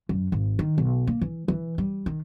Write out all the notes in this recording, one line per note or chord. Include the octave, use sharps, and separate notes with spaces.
F#2
G#1
D#3
B1
A#3
E3
E3
G3
D#3